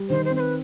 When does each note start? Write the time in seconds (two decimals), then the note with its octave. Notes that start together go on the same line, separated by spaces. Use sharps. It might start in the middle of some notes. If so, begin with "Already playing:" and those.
Already playing: G3
0.09 D#3 C5
0.25 C5
0.31 C4
0.36 C5
0.40 B4